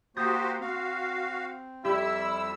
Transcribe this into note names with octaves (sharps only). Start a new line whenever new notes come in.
A#3 F#4 G4 C5 D#6 G6 A6
C4 F#4 F5
F2 G3 E4 G4 E6